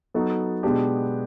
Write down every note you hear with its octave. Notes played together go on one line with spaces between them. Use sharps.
F#3 B3 D#4 F#4 A4
B2 G#3 B3 D4 G4